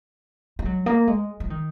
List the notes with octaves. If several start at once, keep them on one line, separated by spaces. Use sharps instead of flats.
G#3
F#3
A#3
G#3
F3
D#3